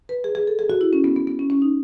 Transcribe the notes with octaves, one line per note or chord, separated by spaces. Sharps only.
B4
G#4
G#4
A4
G#4
F#4
E4
C#4
B3
B3
B3
C#4
C#4
D#4